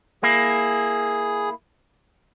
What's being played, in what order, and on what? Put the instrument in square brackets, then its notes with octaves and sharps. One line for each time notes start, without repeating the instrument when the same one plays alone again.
[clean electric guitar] A#3 E4 [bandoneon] G#4